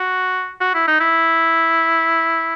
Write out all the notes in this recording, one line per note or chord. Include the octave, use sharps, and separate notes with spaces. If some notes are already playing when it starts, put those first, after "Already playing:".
Already playing: F#4
F#4
E4
D#4
E4